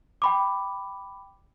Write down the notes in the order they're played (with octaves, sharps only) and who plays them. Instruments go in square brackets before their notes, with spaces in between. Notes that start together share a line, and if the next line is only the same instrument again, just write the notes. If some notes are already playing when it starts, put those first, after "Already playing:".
[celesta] G5 B5 D6